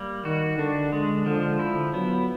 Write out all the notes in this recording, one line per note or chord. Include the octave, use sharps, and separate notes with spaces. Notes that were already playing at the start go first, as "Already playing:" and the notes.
Already playing: G3 A#3
D#3 F#4
D3 D4
D3 G#3
D3 F3
D3 E4
F#3 B3